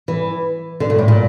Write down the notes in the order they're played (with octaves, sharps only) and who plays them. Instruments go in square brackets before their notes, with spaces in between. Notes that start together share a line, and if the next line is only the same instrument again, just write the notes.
[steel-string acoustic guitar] E3
D3
A#2
A2
A#2